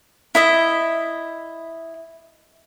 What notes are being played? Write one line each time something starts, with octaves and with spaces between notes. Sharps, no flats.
E4 D#5 E5